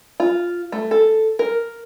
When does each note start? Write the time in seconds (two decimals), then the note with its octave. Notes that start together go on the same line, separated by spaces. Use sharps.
0.20 F4
0.72 A3
0.91 A4
1.39 A#4